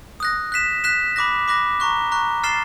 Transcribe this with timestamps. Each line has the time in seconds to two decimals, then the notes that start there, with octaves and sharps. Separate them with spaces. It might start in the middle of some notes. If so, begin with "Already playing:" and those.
0.20 D#6 F#6 A#6
0.52 F#6 B6 E7
0.84 F#6 B6 E7
1.16 B5 D6 F#6 A#6
1.48 B5 D6 F#6 A#6
1.80 A#5 C#6 F#6
2.12 A#5 C#6 F#6
2.43 F6 A6 C7 E7 G7